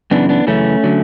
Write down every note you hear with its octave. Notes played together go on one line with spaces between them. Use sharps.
F#2 C#3 E3 B3 D4
B3 D4
F#2 C#3 E3 A3 C#4
D3 F#3